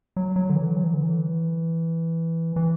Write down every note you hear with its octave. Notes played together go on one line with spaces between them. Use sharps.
F#3
F#3
D3
E3
F#3
E3
D3
E3
E3